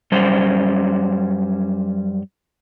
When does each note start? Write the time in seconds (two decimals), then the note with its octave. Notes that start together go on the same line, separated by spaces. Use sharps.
0.12 F#2 G3 C#4 C5